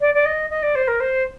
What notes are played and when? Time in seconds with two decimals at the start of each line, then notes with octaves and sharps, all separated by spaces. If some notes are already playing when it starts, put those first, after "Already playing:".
0.01 D5
0.14 D5
0.25 D#5
0.50 D#5
0.63 D5
0.75 C5
0.88 A#4
1.00 C5